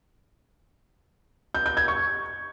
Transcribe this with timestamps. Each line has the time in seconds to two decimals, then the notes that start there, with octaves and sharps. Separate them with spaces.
1.55 G6
1.66 G6
1.77 G#6
1.88 C#6